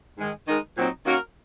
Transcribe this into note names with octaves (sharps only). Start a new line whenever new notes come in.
G#2 D#3 G#3
D#3 G#3 D#4 A#4
A#2 F#3 C4 D#4
D#3 A#3 C#4 F#4 A#4